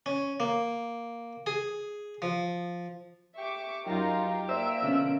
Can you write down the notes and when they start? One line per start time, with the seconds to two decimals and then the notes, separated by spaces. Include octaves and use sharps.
0.06 C#4
0.40 A#3
1.46 G#4
2.22 F3
3.38 G4 E5 C#6 D6
3.87 F#2 F#3 D#4 F4 G4 A#4
4.49 A#3 C5 D5 E5 D7
4.82 B2 D3 F3 C#4